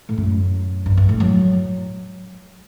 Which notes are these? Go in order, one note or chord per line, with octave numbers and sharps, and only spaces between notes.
A2
F#2
G2
G2
A2
F#3